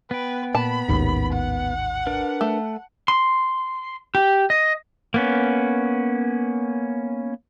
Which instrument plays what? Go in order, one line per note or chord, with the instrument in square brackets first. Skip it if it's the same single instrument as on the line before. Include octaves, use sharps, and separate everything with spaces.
[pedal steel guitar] B3 G5 [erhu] B4
[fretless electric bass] A#2 [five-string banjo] A5 [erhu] B5
[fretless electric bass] A1 D#2 G#2
[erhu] F#5
[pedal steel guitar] D4 A#4 B4
[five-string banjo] A3
[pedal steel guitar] C6
G4
D#5
A#3 B3 C#4